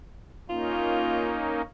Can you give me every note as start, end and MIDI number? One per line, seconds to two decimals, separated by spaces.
0.50 1.62 58
0.50 1.62 61
0.50 1.62 63
0.50 1.39 65